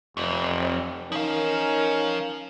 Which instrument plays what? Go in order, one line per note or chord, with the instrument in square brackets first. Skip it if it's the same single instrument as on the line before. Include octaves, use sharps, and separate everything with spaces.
[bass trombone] F1 [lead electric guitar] F2
[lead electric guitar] F3 F5 [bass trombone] C#4 [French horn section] D#4 A#4